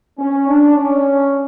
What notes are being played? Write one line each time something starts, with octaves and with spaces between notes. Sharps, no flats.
C#4
D4
C#4